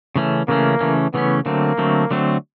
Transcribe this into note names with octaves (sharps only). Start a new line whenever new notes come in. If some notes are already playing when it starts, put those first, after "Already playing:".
C#3 E3 A3 C#4
C#3 E3 A3 A#3 C#4
C#3 E3 A3 C#4
C#3 E3 A3 B3 C#4
D3 F#3 A3 A#3 C4
D3 F#3 A3 C4
D3 F#3 A3 C4